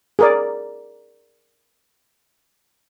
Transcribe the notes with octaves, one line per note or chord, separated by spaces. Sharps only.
G#4 A#4 D5